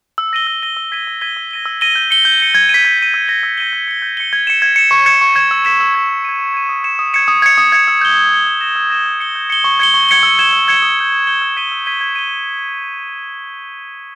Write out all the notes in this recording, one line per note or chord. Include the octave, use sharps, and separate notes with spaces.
E6
A#6 D#7 G7
E6
A#6 D#7 G7
E6
G#6 B6 D#7 G7
E6
G#6 B6 D#7 G7
E6
A#6 D#7 G7
E6
A#6 D#7 G7
G6
C#7 G7
G6
C#7 G7
G#6
B6 D#7
G#6
B6 D#7
E6
A#6 D#7 G7
E6
A#6 D#7 G7
G6
C#7 G7
G6
C#7 G7
G#6
C#7 E7
G#6
C#7 E7
C#6
G#6 C#7 E7
C#6
G#6 C#7 E7
E6
G#6 B6 E7
E6
G#6 B6 E7
E6
G#6 D#7
E6
G#6 D#7
D#6
G#6 C#7 E7
D#6
G#6 C#7 E7
D#6
G#6 C#7
D#6
G#6 C#7
E6
G6 C#7 G7
E6
G6 C#7 G7
E6
A#6 E7 G7
E6
A#6 E7 G7
G6
C#7 G7
G6
C#7 G7
C#6
G#6 C#7 G7
C#6
G#6 C#7 G7
E6
G#6 C#7 E7 G7
E6
G#6 C#7 E7 G7
D#6
G6 C#7 G7
D#6
G6 C#7 G7
E6
G#6 B6 D#7 G7
E6
G#6 B6 D#7 G7
G#6
D#7 G7